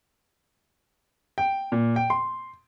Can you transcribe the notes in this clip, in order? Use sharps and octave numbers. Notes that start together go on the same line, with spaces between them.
G5
A#2
G5
C6